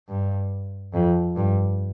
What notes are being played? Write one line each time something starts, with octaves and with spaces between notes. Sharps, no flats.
G2
F2
G2